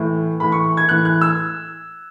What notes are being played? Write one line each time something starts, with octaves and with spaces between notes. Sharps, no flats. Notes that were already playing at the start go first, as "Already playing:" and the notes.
Already playing: A2 E3
A2 E3 B5
C#6
G#6
A2 E3 F#6
F#6
E6